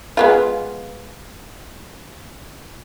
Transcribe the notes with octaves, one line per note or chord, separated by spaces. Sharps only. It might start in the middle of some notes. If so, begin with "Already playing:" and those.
G#3 B3 F4